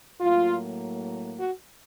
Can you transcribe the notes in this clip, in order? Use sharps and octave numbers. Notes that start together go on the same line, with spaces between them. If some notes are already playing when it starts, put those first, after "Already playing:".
A2 F#3 A#3 F4
F#4